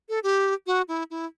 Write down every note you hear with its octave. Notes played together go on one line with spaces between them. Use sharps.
A4
G4
F#4
E4
E4